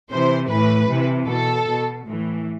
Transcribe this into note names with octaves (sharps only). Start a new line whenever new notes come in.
C3 E3 C5
A2 E3 B4
C3 E3
B2 A4
B2
A2 E3